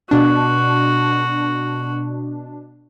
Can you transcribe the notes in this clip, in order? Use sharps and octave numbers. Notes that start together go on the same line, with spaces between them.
B2 D4 F#4